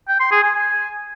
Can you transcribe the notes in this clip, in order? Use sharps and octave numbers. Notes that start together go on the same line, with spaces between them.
G5
C6
G#4
G#5
G#5